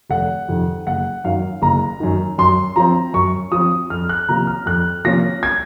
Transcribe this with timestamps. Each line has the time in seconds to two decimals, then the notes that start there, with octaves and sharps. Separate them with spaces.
0.10 F1 F#5
0.48 F2 C3 D#3
0.87 F#1 F#5
1.24 F#2 D#3 F5
1.62 F#1 A#5
2.00 F#2 D#3
2.38 F#2 C6
2.76 F3 C4 A#5
3.14 F#2 C#6
3.52 F3 C4 D#6
3.90 F2 F6
4.09 F#6
4.28 C3 F3 A#3 C#4 A#5
4.47 F6
4.66 F2 F#6
5.04 C3 F3 A#3 C#4 A#6
5.43 G#6